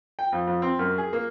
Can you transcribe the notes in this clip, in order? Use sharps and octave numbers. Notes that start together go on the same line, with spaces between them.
G5
F2
F2
C4
F#2
G#4
A#3